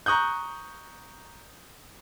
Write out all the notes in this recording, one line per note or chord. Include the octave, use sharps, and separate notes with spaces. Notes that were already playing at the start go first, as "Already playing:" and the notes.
A#5 C#6 D#6 F#6 G6